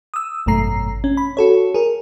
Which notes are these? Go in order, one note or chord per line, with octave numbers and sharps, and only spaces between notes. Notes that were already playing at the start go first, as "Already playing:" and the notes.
D#6 E6
G#1 F#2 B2 A3 A#5 C7
C#4
B5
F#4 A4 C#5
G#4 A#4